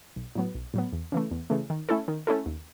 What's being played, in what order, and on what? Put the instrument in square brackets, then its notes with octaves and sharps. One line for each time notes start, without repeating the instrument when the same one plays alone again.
[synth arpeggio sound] B1
A2 F#3 B3
B1
A2 F#3 B3
E2
C#3 E3 A3
E2
C#3 E3 A3
D#3
A3 C#4 E4 A4
D#3
A3 C#4 E4 A4
D#2